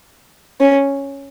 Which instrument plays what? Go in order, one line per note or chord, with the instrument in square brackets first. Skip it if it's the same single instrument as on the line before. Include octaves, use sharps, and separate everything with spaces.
[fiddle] C#4